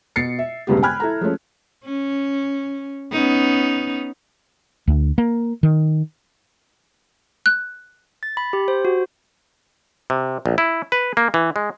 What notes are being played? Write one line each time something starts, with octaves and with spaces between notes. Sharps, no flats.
B2 A6 C7 C#7
E5
E1 D2 G2 C#3 B3 G4
G5 G#5 B5 F6 F#6 G#6
E4 A4 A#5
F3 G#3 A3 C#4
C#4
B3 C#4 D#4
D2
A#3
D#3
F#6
A6
B5
G4
C5
F#4
C3
A#1
E4
B4
A#3
E3
G#3